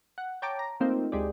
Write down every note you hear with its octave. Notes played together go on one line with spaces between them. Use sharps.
F#5
C#5 G5 A5 A#5 D6
A#5
A3 A#3 C4 D#4 F4
D2 G#3 G4 D5